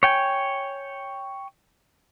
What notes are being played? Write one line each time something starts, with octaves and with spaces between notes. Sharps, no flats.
C#5 G5 G#5